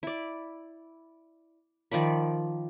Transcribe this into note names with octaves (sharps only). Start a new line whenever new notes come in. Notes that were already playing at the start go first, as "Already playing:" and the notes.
E4 D5
D#3 F3 D5 B5